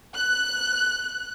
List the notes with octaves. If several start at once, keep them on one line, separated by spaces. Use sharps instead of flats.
F#6